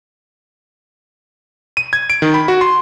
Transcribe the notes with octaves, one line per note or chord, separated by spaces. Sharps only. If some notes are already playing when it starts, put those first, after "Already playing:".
D#7
G#6
D7
D#3
B5
F#4
C6